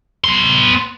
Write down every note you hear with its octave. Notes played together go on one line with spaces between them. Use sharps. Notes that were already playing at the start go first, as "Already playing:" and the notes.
B3 C6